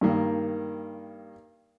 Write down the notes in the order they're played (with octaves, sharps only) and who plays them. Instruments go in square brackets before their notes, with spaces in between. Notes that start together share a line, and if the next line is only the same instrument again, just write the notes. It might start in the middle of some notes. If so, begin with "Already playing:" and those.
[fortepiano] G2 D#3 A#3